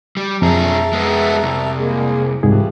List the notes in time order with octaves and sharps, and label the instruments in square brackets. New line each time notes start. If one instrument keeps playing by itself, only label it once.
[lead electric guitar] G3
[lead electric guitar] B1 G#4 [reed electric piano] F2 [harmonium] E5 A5 A#5
[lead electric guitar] G#3 B3
C2
[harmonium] G#3 A#3 G#4
[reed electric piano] C2 G#2 G#4 [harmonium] E3 F3 G3